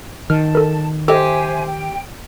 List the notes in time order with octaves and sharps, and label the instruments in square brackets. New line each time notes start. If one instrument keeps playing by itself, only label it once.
[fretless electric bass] D#3 [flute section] A5 [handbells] F6
[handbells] A4 A#4
[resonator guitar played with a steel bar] G4 [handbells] A4 D#5 [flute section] C5 E5 G#5
[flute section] G5